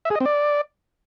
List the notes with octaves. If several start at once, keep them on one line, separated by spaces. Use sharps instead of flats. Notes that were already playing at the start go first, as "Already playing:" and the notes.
E5
G#4
D#5
C4
D5